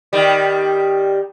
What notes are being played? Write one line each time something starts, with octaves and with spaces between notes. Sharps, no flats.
D#3 G3